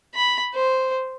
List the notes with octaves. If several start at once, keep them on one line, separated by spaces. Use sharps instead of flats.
B5
C5